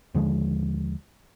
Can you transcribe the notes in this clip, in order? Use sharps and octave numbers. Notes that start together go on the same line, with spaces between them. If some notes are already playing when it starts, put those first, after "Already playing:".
D#2 D3 F3 G#3